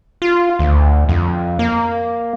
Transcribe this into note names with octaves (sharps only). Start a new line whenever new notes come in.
F4
D2
F2
A#3